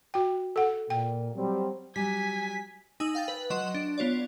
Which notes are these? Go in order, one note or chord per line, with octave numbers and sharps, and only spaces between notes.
F#4 G5
A4 F#5
A#2 G5
F#3 G3 C4
F#3 G3 G#5 B6
D#4 G#5 D#6 E6 F#7
F5 G5 A6
B4
F#3 D#5 F#5 C6 E7
D4
B3 F4 C#5 D5